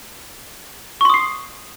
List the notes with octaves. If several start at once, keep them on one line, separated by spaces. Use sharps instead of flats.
C6 C#6 D#6 C7